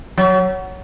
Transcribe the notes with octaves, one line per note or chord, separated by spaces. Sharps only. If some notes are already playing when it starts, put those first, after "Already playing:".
F#3